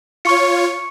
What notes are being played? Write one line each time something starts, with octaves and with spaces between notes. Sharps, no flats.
F4 C#5 C#6 C#7